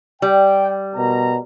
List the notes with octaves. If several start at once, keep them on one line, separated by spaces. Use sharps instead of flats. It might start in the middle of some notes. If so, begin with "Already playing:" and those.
G3 G5
B2 A#4 A#5